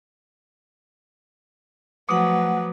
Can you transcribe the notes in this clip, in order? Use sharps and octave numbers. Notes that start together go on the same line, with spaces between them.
F3 F#3 A3 B4 F#5 D6 D#6